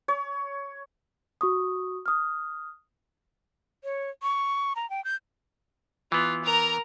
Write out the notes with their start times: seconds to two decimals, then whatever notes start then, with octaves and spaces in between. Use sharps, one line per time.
0.08 C#5
1.41 F#4 C#6 D#6
2.06 D#6 F6
3.84 C#5
4.23 C#6
4.76 A#5
4.90 G5
5.05 G6
6.12 E3 B3 F4
6.44 A#4 A#5